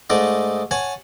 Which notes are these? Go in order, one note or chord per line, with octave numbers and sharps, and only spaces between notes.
G#2 A3 D#4 D5 D#5
C#5 F#5 G#5 A5